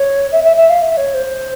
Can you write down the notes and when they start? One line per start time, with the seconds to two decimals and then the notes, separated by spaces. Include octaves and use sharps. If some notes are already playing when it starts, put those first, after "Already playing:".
Already playing: C#5
0.32 E5
0.44 E5
0.56 E5
0.69 F5
0.81 E5
0.97 C#5
1.14 C5